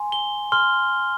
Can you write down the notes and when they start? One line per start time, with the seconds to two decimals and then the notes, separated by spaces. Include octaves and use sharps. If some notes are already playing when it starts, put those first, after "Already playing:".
Already playing: G#5 C6
0.12 G7
0.52 C6 F6 G7